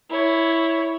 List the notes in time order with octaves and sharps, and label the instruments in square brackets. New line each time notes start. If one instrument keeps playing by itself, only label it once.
[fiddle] E4 C#5